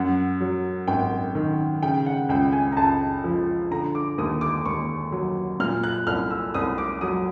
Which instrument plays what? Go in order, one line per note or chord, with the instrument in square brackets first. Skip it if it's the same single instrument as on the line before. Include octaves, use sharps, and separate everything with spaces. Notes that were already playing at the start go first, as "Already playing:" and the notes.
Already playing: [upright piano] F#2 F#5
F#3
G#1 G5
D#3
C#3 G5
F#5
C#2 G5
G#5
A#5
C#2 A5
F3
D3 A#5
D6
D#2 D#6
D6
D#2 C#6
F#3
A#2 F6
F#6
C2 F6
E6
C2 D#6
D6
F#3 D#6